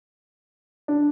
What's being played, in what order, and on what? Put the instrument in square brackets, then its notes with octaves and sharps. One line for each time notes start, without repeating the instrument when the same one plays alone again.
[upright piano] D4